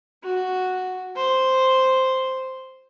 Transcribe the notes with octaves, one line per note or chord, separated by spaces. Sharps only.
F#4
C5